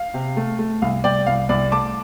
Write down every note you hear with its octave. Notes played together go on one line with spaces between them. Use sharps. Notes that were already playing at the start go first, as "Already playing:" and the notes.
Already playing: F5
C3
A3
A3
C2 F5
C2 D5 G5
C2 F5
C2 D5
A3 A5 D6